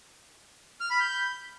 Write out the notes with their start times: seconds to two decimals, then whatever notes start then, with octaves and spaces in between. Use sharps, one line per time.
0.80 F6
0.90 B5
1.00 G6